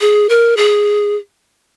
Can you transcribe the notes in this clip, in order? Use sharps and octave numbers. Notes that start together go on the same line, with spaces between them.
G#4
A#4
G#4